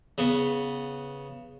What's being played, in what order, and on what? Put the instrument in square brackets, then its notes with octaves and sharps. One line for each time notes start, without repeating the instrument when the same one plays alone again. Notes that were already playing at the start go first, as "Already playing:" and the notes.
[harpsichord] C#3 B3